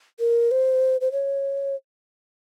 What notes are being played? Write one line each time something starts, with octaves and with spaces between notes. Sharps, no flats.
A#4
C5
C5
C#5